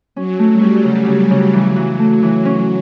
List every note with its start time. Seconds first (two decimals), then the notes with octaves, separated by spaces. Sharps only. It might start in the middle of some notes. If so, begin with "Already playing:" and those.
0.16 F#3 C#4
0.39 A3
0.50 G3
0.61 C#4
0.84 C#3 G3
1.08 C#3
1.30 C#3
1.53 E3 F#3
1.76 E3
1.99 A3
2.23 E3
2.45 C#4